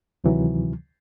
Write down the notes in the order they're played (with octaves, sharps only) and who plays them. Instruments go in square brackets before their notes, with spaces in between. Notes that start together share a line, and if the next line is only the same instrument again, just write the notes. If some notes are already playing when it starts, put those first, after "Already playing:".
[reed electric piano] D2 C3 D#3 E3 F#3